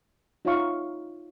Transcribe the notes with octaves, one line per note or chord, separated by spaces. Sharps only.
D#4 F4 C#5 E5 F5 C#6